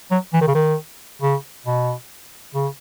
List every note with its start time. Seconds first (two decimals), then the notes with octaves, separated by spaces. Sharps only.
0.11 F#3
0.33 E3
0.41 D#3
0.48 C#3
0.55 D#3
1.22 C#3
1.66 B2
2.54 C#3